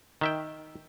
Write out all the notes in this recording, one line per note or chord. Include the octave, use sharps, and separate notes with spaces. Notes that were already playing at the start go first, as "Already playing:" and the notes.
D#3 E5 G5